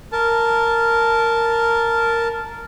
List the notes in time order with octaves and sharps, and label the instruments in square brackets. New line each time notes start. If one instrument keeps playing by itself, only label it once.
[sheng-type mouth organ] A#4 A5